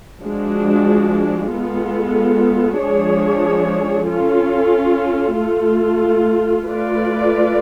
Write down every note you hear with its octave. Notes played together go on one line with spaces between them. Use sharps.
F3 G#3 D4 F#4
G#3 B3 F4 A4
F3 G#3 D4 G#4 C#5
C#4 F4 A4
A3 F4 A4
A3 F4 B4 D5